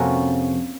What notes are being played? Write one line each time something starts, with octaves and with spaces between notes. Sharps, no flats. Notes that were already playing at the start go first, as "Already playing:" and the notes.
Already playing: F2 C3 F3 A#3 C#4 F#4